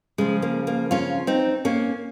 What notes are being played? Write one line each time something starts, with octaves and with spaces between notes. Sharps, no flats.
C#3 F3 G#3
A#3
A#3
C#4 F4
C4 D#4
A#3 C#4